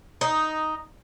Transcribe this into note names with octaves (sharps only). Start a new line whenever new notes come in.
D#4